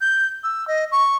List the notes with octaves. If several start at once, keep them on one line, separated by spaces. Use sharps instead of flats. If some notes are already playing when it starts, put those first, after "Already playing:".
G6
E6
D#5
C#6